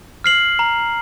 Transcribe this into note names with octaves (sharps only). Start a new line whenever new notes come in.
F6 C7 F#7
A#5